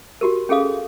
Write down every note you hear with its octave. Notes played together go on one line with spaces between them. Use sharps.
F#4 G4 A#4
C#4 G#4 A4 F5 D#6